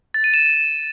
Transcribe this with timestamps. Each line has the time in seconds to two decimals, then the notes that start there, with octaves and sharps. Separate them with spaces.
0.14 A6
0.24 D#7
0.34 E7